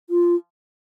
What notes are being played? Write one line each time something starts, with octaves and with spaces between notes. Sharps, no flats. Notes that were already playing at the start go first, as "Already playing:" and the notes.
F4